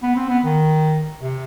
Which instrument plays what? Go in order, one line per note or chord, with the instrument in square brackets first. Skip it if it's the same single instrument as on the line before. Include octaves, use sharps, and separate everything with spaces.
[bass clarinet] B3
C4
B3
D#3
C3